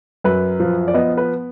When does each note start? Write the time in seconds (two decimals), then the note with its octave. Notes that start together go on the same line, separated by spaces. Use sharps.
0.24 F#2 B4
0.60 F3
0.88 D5
0.94 B3 D#5
1.17 B4